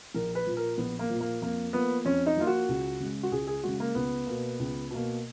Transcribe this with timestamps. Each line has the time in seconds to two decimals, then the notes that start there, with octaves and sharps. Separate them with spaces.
0.14 A#1 A#4
0.35 B4
0.46 A#2 F3
0.57 A#4
0.78 A#1 B3
0.99 A#3
1.10 A#2 F3
1.21 A#3
1.42 F2 A#3
1.73 F3 A#3 B3
2.05 F2 C#4
2.26 D#4
2.36 F3 A#3 F4
2.47 F#4
2.69 C#2
3.00 C#3 G#3
3.23 F#4
3.31 C#2 G#4
3.47 G#4
3.63 C#3 G#3 F#4
3.80 A#3
3.95 C#2 B3
4.27 B2 A#3
4.59 C#2
4.90 B2 A#3